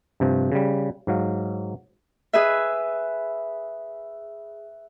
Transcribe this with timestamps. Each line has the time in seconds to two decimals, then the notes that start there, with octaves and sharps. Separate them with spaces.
0.20 G2 C3 F3
0.52 C#3 G3
1.07 G#2 F#3 F5
2.33 G#4 B4 E5